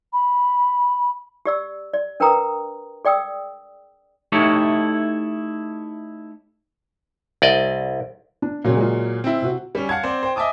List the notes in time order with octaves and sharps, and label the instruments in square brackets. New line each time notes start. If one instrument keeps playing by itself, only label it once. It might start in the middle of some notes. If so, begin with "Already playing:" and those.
[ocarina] B5
[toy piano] G4 D5 E6
D5
D4 A#4 B4 G5 A#5 D#6
G#4 D5 G5 D#6 E6
[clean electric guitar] A3 D#4 E4 G4 A4 C#5
[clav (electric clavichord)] C2 D5 D#5
[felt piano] D4
[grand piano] A#2 F#3 [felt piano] C#3 F5
[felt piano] G#3 F4
[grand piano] C4 E4
[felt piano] C3 F#4
[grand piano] G3 C#4
F5 F#5 A5 G#6
C4 C5 D5
C5 G5
D#5 E5 G#5 A5 D6 D#6